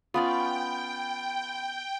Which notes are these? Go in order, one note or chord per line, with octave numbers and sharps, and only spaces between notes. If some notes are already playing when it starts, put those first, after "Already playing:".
B3 C#4 F4 D5 G5 B5 D#6